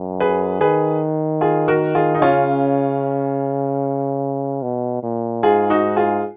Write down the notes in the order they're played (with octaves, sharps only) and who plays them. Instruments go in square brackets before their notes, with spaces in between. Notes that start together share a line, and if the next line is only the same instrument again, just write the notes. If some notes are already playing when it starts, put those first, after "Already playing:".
Already playing: [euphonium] F#2
[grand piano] G#4 B4
[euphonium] D#3 [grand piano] G#4 B4
[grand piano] F4 G#4
F#4 A#4
F4 G#4
D#4
[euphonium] C#3 [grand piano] C#4 F4
[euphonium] B2
A#2
[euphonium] G#2 [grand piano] F4 G#4
[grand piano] D#4 F#4
F4 G#4